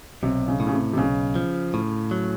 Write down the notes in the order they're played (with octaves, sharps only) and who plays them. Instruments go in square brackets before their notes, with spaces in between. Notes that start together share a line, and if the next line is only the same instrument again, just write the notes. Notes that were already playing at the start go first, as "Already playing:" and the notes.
[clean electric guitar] B1 [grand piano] C3
[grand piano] C#3
[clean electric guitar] A2
[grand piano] C#3
C3
C3
[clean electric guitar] B1 [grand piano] C#3
[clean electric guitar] F3
A2
F#3